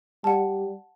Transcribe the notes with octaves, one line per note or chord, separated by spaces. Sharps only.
G3 F#5 A5